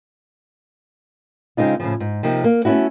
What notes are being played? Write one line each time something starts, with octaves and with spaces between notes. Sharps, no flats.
C#3 G#3 C4 D#4 F4
A2 C#3 F3
G#2
C3 F3 A#3 D#4
A#3
A3 B3 C#4 E4 F#4